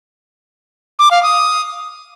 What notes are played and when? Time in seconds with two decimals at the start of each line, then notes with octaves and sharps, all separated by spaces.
0.99 D6
1.11 F5
1.23 D#6